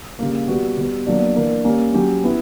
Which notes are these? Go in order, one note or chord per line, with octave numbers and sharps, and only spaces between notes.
C#3 G3 A#3
G3 B3 F#4
B2 G3 B3
B2 F#3 A#3 D4
E3 A#3 D4 A#4
G3 A#3 C#4
F#3 C#4 G4
B3 E4